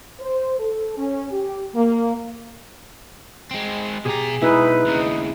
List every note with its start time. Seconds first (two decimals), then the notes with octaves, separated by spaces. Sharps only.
0.21 C5
0.60 A4
0.98 C#4
1.31 G4
1.75 A#3
3.51 G#3 C4
4.05 B2 G4 G#4 A#5
4.42 B1 G#3 D#4 E4 B4
4.86 D#2 C#3 D#4